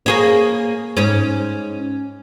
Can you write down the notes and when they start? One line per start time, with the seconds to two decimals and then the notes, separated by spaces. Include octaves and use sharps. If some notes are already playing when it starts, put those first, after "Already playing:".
0.06 A#3 G#4 C#5
0.97 G#2 C#4